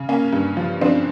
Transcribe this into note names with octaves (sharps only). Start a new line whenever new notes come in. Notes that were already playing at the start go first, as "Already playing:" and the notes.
Already playing: C#3
A#3 C#4
G2
F3
F3 C4 D4